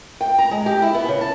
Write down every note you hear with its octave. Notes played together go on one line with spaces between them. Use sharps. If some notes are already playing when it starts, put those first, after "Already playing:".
G5
A#5
G#3
G4
E4
B3
C#3
A5